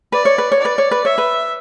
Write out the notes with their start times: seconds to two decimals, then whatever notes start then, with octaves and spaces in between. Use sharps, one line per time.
0.12 B4 D5
0.25 C#5
0.38 B4
0.52 C#5
0.59 D5
0.65 B4
0.78 C#5
0.91 B4
1.05 C#5 E5
1.18 B4